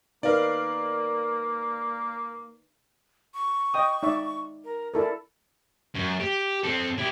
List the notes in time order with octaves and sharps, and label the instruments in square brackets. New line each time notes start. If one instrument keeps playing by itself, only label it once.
[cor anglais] A#3 [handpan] D#4 B4 F5 [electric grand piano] A#4 D5
[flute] C#6
[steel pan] D#5 G5 D#6
D#4 D5 E5
[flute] A#4
[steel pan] E4 A4 A#4 [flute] D5
[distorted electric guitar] F#2
G4
C4 A4
E4 G4